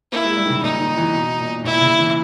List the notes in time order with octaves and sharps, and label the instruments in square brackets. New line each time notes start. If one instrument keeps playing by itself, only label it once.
[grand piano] A#3 [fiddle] E4
[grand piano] G#3
G3
D#3
C#3
[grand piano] A#2 [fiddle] D#4
[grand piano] D#3
E3
B2
A#2
[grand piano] A#2 [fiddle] E4
[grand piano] C#3
E3